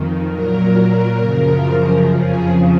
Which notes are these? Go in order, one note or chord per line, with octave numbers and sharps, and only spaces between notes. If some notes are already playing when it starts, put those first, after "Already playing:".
Already playing: F2 D#3
A#2 F#3 A#4
F#2 C#3 F3
F2 C#3 F3 G#4